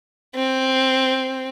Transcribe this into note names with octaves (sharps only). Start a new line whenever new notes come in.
C4